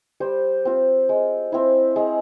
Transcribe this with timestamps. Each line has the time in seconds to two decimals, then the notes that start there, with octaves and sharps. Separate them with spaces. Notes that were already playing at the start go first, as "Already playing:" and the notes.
0.20 G3 C5
0.65 C4 F4
1.09 G#3
1.52 C4 E4
1.96 G#3